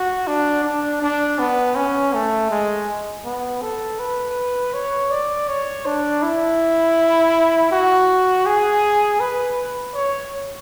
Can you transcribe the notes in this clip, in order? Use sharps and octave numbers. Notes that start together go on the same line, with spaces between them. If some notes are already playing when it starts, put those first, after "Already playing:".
Already playing: F#4
D4
D4
D4
B3
C#4
A3
G#3
B3
A4
B4
C#5
D5
C#5
D4
E4
F#4
G#4
B4
C#5